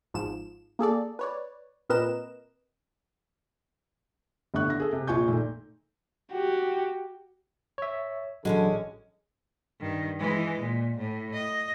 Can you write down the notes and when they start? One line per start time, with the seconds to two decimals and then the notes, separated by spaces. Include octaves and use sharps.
0.14 G#1 G#2 F3 E7
0.79 A#3 G#4 A4 D5
1.19 B4 C#5 D5
1.90 A#2 C4 A#4 B4 D#5 E7
4.54 G1 A2 D3 C#6 F#6
4.67 D3 A#6
4.80 G#4 A4
4.93 C3
5.07 A#1 F4 F5 G#5 C#6 G6
5.28 A#2 D#3 A3
6.32 F#4 G4
7.78 C#5 E5
8.45 A1 D3 F#3 G#3 B3 C#4
9.81 G2 D#3
10.20 E3 G#3
10.62 A#2
10.98 A2
11.34 D#5